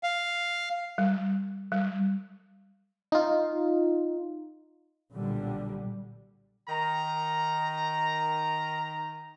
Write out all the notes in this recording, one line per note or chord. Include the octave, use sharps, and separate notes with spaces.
F5
G3
G3
D#4 F4
B1 A#2 D3 G3
D#3 A#5